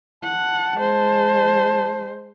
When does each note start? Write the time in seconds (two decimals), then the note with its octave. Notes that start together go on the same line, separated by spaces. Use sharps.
0.24 F#5 A5
0.77 G#3 C5